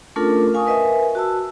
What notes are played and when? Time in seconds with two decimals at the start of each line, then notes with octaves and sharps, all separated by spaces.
0.16 A3 C#4 D4 F4 A4 A#4
0.54 F5 G#5 C#6 D#6
0.67 A#4 B4 D#5 E5 G#5
1.15 F#4 A5 E6